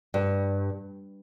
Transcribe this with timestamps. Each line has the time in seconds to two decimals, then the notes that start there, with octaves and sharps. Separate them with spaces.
0.14 G2